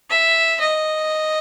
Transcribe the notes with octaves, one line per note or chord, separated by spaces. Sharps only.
E5
D#5